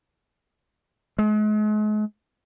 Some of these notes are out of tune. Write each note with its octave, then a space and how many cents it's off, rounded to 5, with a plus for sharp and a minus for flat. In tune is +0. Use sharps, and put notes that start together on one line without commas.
G#3 +40